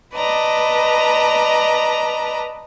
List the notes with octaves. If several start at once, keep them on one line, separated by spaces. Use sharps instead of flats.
B4 D5 D#5 A5 A#5